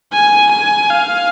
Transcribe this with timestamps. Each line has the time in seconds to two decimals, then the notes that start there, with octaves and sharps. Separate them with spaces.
0.13 G#5
0.51 G#5
0.90 F5